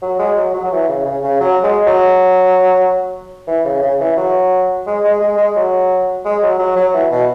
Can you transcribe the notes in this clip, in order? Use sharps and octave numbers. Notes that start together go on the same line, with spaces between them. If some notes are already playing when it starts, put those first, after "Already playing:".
F#3
G#3
F#3
F#3
F#3
E3
C#3
C#3
C#3
F#3
G#3
F#3
E3
C#3
C#3
E3
F#3
G#3
G#3
G#3
G#3
F#3
G#3
F#3
F#3
F#3
E3
B2